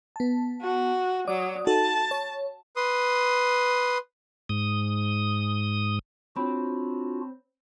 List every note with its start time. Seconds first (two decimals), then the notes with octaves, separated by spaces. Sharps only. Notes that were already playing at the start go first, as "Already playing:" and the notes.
0.16 B3 A5
0.62 F#4
1.27 F#3 D5 D6 D#6
1.67 D#4 F#4 A4 A5
2.11 C#5
2.76 B4 C6 D#6
4.49 G#2 D#6
6.36 C4 D4 F4 F#4 C#5 B5